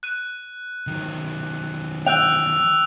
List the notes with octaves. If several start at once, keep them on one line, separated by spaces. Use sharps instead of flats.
F#6 D#7
D#3 F#3
G5 E6 F#6 F7